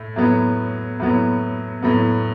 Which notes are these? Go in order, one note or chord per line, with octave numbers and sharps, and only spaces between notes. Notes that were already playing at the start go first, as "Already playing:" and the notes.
Already playing: A2
A2 F#3 B3
A2 F#3 B3
A2 F#3 B3